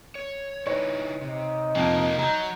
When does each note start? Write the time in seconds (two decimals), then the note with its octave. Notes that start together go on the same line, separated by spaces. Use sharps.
0.15 C#5
0.67 D#4 E4 B4 C#5
1.21 C3 D#4
1.76 F2 F3 A#3
2.19 F#3 A#5 G6